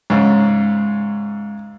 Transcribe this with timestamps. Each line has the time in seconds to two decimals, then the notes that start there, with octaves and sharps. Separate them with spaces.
0.10 G#2 C#3